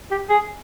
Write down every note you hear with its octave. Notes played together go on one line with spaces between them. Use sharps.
G4
G#4